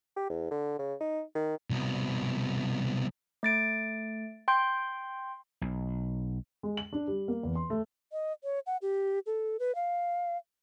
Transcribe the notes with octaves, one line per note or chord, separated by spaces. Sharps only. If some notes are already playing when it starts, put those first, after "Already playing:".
G4
E2
D3
C#3
D#4
D#3
C2 B2
A3 A6 D7
G5 C6 G6
B1
G#3
F#7
D4
G3
A#3
E2
C6
A3
D#5
C#5
F#5
G4
A4
B4
F5